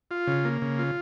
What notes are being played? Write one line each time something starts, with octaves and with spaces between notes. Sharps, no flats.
F4
C#3
A#3
C#3
F4